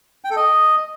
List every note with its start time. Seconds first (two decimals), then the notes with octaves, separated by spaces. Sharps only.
0.24 G5
0.30 A4
0.36 D#5